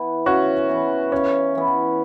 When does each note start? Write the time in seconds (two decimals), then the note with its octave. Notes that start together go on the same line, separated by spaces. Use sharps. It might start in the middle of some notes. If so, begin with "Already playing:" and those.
Already playing: E3 B3 E4
0.25 C#3 C#4 F#4
0.69 E3 B3 E4
1.12 C#3 C#4
1.55 E3 B3 E4